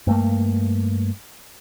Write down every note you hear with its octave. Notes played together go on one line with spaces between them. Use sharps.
G2 A3 A#3